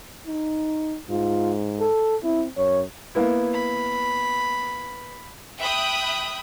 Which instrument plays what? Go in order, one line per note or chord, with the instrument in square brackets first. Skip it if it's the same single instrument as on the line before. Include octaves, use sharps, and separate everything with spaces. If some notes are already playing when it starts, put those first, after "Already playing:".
[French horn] D#4
[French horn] G#2 [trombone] F4
[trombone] A4
[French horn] C4 [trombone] E4
[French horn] F#2 [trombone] C#5
[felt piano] A#3 B3 E4
[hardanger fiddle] B5
[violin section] E5 G5 B5 D#6 F#6